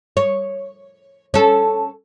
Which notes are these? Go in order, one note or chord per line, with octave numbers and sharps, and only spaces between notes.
C#5
C#4 A4